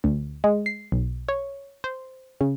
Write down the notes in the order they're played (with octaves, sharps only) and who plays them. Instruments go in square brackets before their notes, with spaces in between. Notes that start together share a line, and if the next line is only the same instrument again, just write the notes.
[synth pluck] D2
G#3
C7
B1
C#5
C5
C#3